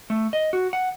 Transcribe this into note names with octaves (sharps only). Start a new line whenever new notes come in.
A3
D#5
F#4
F#5